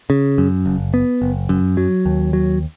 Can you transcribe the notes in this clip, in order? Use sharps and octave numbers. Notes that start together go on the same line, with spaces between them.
C#3
F#2
F#1
B3
F#1
F#2
F#3
D#2
F#3